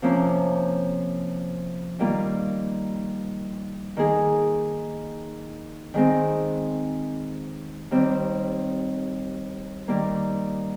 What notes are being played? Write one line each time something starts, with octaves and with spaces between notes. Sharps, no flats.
C3 F3 A#3 C#4
D#3 G3 A#3 F4
D#3 A#3 D#4 G#4
D#3 G#3 C4
D#2 D#3 G3 C4
D#3 G3 A#3